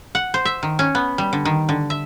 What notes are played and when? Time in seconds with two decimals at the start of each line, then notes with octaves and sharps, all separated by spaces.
0.15 F#5
0.34 C5
0.45 E5
0.63 D#3
0.79 C#4
0.95 B3
1.18 G3
1.33 D3
1.45 D#3
1.69 D3
1.90 E5